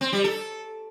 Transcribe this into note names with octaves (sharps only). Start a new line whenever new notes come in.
C4
G3
A4